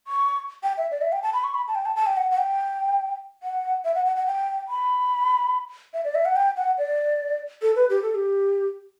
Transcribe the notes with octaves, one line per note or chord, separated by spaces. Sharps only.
C#6
G5
E5
D5
E5
G5
A5
B5
C#6
B5
A5
G5
A5
A5
G5
F#5
F#5
G5
F#5
E5
F#5
F#5
F#5
G5
B5
E5
D5
E5
F#5
G5
F#5
D5
A4
B4
G4
A4
G4